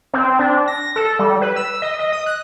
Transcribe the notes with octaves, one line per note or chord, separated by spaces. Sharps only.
C4
D4
A#6
A4
G3
B4
E6
D#5
D#5
D#6
F#6